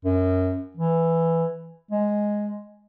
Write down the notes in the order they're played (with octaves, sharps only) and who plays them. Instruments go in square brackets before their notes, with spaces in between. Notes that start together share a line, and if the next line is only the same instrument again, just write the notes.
[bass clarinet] F#2
E3
G#3